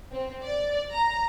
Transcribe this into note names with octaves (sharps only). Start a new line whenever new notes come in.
C4
D5
A#5